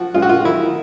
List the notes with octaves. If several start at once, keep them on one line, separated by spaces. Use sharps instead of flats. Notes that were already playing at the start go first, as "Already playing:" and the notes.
Already playing: F3 F#4
G#3 F4
F#4
F4
D#3 E4